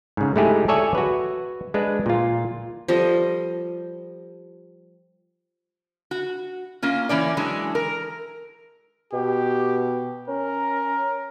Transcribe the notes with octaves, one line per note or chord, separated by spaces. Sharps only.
G#2 C#3
G#3 A3 D#4 E4 G4 G#4
G#4 A4 C#5 D5 E5 G#5
F#4 B4
G#3 D4 B4
A#2 F4
F3 G3 A4 D#5
F#4
A#3 C#4 F4
E3 A#3 C#4 D5
E3 F#3 G#3 D4
A#4
B2 G4
C#4 A#4